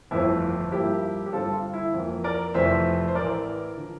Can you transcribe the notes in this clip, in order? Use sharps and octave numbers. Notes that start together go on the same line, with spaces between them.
G1 F2 E3 A3 C4 E4
G2 F3 A#3 E4 G4
G4
G2 D3 G3 C4 F4 A4
F4
E4
F2 E3 A#3
A#4 D5
F1 F2 E3 A3 C4 C5 E5
C5
A1 A2 E3 A#4 D5
D3 F3